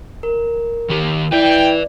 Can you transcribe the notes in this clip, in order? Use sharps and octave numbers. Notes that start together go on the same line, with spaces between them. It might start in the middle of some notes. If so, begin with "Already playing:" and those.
A#4
D#3 G4
E4 B4 D5 E5 G5